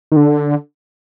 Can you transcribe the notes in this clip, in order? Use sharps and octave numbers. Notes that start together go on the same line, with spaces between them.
D#3
D3